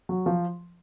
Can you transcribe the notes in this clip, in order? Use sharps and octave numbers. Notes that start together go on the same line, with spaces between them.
F#3
F3